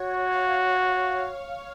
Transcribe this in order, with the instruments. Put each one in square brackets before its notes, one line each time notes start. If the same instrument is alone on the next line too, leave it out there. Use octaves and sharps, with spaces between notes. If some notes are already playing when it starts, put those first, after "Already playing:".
Already playing: [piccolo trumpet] F#4 [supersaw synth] C#5
[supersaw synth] F5
F5